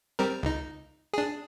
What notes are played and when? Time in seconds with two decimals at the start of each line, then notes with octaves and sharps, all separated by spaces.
0.19 G3 C4 A#4
0.43 C#2 D#4
1.13 D4 G#4